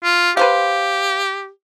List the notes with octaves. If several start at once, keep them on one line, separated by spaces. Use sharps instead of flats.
F4
G4 B4 C5 F5